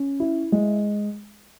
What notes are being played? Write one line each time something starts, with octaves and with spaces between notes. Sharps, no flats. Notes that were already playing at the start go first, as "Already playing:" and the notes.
Already playing: C#4
E4
G#3